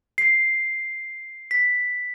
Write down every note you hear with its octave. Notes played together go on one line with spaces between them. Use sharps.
C7
B6